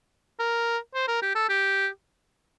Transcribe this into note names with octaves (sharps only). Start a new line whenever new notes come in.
A#4
C5
A#4
G4
A4
G4